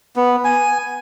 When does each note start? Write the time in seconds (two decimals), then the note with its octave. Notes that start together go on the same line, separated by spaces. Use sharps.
0.16 B3
0.44 G#5